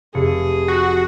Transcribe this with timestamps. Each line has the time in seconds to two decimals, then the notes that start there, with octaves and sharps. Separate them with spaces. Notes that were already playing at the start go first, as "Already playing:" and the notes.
0.14 F1 G#4 C#7
0.68 F#4